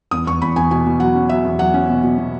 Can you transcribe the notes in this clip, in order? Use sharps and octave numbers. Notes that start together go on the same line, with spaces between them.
E2 D#6
E2 C#6
E2 B5
E2 G#5
B2 G#5
B2
F#3 F#5
C#4
F#3 E5
E2
F#3 F#5
C#4
B2
B2
B2